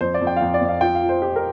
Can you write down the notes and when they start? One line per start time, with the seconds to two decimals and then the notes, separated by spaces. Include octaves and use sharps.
0.01 F2 C5
0.14 D5
0.21 F2
0.27 G5
0.36 F5
0.41 F2 G5
0.54 D5
0.61 F2
0.69 F5
0.81 F4 G5
0.95 F5
1.02 F3
1.09 C5
1.22 F4 G4
1.36 A#4